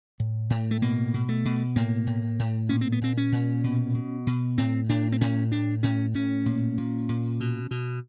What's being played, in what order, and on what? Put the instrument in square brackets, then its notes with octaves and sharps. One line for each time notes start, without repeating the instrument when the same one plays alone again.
[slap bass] A2
A2
A3
B2 A#3
B2
A3
B2
A2 A#3
A2
A2
A#2 C#4
C4
B3
A#2 C4
C#4
A#2
B2
B2
B2
A2 C4
A2 D4
C4
A2 C#4
A2 D4
A2 C#4
A2 C#4
A#2
A#2
A#2
B2
B2